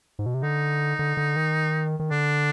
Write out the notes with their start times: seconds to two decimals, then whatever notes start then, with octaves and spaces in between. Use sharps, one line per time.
0.19 G#2
0.26 B2
0.34 C3
0.43 D3 D#4
0.99 D3
1.17 D3
1.36 D#3
2.00 D#3
2.11 D3 D4